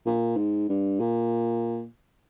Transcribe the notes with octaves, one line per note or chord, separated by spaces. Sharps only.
A#2
G#2
G2
A#2